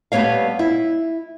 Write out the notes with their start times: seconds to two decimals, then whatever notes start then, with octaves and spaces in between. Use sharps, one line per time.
0.12 G3 A3 B3 C#5 F5
0.59 E4